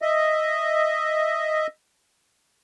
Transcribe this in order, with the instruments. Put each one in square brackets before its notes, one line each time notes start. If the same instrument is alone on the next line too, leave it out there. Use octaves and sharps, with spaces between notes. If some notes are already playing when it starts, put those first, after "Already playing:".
[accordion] D#5 E5